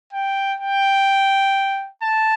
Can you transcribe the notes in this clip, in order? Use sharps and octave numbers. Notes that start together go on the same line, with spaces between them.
G5
G5
A5